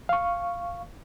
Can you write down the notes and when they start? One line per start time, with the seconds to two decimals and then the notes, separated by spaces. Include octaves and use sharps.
0.09 F5 C#6